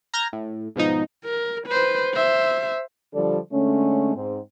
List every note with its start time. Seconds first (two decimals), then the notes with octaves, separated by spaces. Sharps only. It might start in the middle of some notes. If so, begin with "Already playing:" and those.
0.14 A#5 F6 G6 G#6 A#6
0.33 A2
0.76 G#2 B2 F3 D#4
1.25 A#4
1.67 B4 C5
2.14 C5 E5
3.14 D3 F3 G3 D4 A4 D5
3.52 D3 G#3 A3 C#4
4.15 G#2 C4